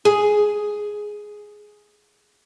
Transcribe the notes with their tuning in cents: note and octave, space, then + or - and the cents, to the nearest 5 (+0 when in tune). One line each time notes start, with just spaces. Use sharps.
G#4 +5